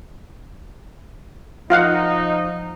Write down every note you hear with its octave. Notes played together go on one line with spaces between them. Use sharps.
F3 D#4 F4 F5 F#5